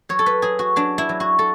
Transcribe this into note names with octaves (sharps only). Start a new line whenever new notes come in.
F#3 C#5
A4
B4
F#3 G#4
F#4
F#3 D4
E4
F#3
F#4
A4